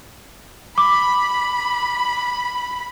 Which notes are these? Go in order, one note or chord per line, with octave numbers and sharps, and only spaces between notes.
B5 D6